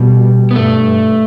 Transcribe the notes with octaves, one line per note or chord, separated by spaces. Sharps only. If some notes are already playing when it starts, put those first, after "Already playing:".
Already playing: B2 G3
B3
G2 A3